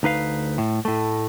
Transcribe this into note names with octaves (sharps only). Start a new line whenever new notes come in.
D2 D#4 B4 F5
A2
A2 A3